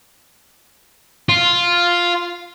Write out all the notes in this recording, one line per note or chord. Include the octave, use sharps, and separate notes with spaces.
F4